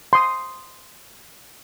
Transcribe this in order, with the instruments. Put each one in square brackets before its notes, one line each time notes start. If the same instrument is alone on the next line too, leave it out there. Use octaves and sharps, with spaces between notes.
[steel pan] C6 D#6